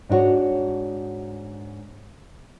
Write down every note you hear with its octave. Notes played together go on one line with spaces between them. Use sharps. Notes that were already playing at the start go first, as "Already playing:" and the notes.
G#2 D4 D#4 F#4 C#5